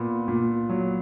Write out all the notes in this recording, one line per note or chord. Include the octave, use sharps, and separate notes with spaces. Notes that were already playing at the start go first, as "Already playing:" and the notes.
Already playing: A#2 B3
A#2
F#3